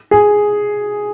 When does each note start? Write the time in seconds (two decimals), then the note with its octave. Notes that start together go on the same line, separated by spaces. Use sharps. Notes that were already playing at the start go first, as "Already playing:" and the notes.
0.11 G#4